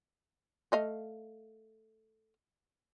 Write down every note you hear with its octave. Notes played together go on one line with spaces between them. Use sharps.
A3 D#5 F5